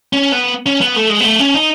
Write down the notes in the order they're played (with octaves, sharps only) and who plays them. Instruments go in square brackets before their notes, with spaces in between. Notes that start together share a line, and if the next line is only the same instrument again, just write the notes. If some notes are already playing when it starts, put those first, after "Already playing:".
[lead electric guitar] C#4
B3
C#4
B3
A3
G#3
B3
A3
C#4
D#4